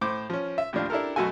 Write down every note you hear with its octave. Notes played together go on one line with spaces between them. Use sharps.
A2 C5 D6
F3 C#4
E5
D#2 A2 F3 D4 F4
D4 E4 G4 A4 A#4
F#2 B2 A3 F#4 A4 G#5